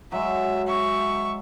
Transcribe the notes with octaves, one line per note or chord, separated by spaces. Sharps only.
F#3 G#3 E5
E5 C#6